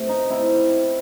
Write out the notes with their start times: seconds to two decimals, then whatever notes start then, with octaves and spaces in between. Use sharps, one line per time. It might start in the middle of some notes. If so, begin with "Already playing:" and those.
Already playing: C3 A3
0.09 D#4
0.30 C4 E4